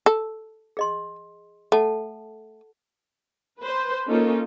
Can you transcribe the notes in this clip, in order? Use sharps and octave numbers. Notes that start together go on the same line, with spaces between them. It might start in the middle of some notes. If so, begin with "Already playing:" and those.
A4
G#4 D#5 C6
A3 A4 F#5 A5
B4 C5
A#3 C#4 D#4 F4 A4